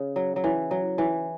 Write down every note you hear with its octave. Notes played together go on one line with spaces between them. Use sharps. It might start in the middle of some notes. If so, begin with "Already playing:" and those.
Already playing: C#3
F#3
F#3
E3
F#3
E3